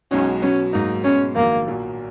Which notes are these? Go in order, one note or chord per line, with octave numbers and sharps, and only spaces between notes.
B1 B2 G#3 C#4 D#4 F#4
B2 F#3 B3 C#4
G#2 F#3 A#3 D#4
B2 G#3 B3 C#4
A#1 G#2 D#3 F#3 A#3
B1 A#2 F#3 A#3